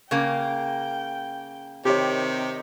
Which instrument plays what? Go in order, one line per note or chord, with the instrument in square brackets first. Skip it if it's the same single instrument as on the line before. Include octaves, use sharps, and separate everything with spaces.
[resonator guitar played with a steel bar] C#3 A#3 [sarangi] G5
[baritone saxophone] C3 [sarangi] D#3 [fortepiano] G4 C#5